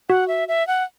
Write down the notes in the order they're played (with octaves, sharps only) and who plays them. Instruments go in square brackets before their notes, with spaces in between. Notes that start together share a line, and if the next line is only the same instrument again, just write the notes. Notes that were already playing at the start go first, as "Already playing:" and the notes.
[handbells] F#4 [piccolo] F#5
[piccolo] E5
E5
F#5